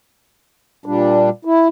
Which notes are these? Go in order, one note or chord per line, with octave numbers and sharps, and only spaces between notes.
A#2 G3 D4
E4